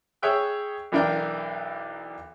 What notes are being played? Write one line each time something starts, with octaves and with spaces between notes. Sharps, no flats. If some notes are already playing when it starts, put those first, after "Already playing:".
G#4 C#5 E5 G5 E6 F#6
B1 E3 D4 A#4 G5